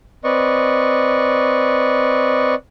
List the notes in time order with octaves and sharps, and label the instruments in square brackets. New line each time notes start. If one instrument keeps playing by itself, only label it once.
[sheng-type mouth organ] C4 B4 D5 D#5 C#6